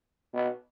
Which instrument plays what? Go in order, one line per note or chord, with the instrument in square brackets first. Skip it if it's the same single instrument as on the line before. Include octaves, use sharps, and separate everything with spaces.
[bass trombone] B2